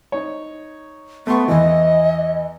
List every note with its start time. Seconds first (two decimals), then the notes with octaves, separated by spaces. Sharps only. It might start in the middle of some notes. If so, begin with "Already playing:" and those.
0.12 D#4 C#5
1.27 A3 B3 C6 C#6
1.48 E2 E3 D#5